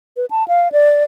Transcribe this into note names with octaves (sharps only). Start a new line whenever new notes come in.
B4
A5
F5
D5